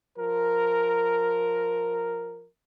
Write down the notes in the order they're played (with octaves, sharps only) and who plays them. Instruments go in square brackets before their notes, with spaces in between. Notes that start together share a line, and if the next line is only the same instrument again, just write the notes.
[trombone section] F3 A#4